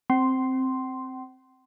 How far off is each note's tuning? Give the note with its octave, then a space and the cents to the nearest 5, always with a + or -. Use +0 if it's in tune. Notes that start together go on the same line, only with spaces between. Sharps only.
C4 +0 G5 -45 C6 +0